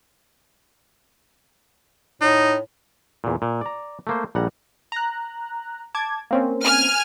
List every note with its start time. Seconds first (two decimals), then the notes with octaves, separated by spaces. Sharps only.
2.21 A2 D#4
3.24 E2 A#2
3.42 A#2
3.61 D5 A#5
4.07 A3 A#3 C5
4.35 A#1 G3 F#5 A#5
4.92 A#5 F#6
5.95 A5 D6 G#6
6.31 A#3 C4 C#4
6.65 G#5 F6